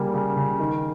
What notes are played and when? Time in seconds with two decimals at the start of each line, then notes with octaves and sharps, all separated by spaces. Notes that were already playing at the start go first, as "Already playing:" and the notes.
Already playing: C#3 G3 A#3
0.14 C#3
0.37 C#3
0.60 D#3